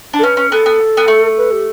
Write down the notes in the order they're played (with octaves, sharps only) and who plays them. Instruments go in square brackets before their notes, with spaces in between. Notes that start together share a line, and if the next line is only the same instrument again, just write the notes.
[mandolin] D4
[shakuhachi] A4
[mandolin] C#4 [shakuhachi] B4
[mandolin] C#4
[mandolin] B3 [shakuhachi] A4
[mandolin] B3
B3
A3
[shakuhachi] B4
G4